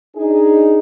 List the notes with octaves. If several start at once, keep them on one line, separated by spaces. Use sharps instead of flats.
D4 D#4 G#4